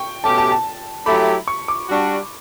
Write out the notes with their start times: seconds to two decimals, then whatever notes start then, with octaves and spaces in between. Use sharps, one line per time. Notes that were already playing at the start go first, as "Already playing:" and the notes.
Already playing: G5 C#6
0.24 B2 A3 C#4 G4 A5
0.38 A5
0.52 A5
1.06 F#3 A3 E4 G4 B5
1.48 C#6
1.68 D6
1.89 G3 D4 F#4